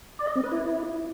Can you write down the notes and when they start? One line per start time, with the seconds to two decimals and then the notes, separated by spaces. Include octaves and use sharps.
0.19 D5
0.27 D#5
0.35 C4
0.43 B4
0.52 E4